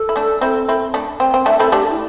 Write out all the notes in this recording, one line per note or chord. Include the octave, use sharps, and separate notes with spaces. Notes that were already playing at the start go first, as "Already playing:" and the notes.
Already playing: A4
E4
A3 D4
C4 E4
C4 E4
A3 D4
C4 G5
C4 G5
A3 D4 E5
C4 E4 A4
A3 D4 G4
E4